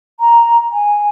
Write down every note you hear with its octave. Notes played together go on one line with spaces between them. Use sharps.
A#5
G#5